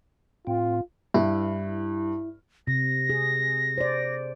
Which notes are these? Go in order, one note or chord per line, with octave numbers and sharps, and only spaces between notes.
A2 C4 F4
G2 E4
C3 A#6
G#4
C5 D5